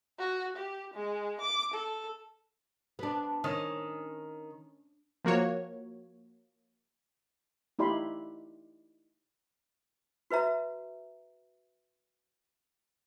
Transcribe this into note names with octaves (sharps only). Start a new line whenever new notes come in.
F#4
G4
G#3
D6
A4
B3 D4
D#3 C#4
F3 A#3 F#4 C#5
D#4 E4 G4 D5 B5 C6
F#4 B4 E5 A#5